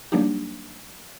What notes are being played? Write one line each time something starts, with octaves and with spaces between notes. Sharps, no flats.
F#3 G3 A#3 D4 D#4 G4